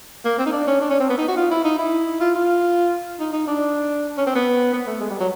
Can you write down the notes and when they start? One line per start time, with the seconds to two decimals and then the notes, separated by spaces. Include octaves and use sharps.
0.25 A#3
0.38 C4
0.46 D#4
0.52 D4
0.67 C#4
0.81 D4
0.90 C#4
1.00 C4
1.10 B3
1.18 D#4
1.28 F#4
1.37 F4
1.51 E4
1.64 D#4
1.78 E4
2.20 F4
2.35 F4
3.20 D#4
3.33 D#4
3.47 D4
4.17 C#4
4.27 C4
4.35 B3
4.73 B3
4.87 A3
5.01 G#3
5.10 G3
5.20 F#3